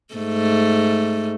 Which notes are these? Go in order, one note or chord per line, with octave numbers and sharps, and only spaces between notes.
G#2 A3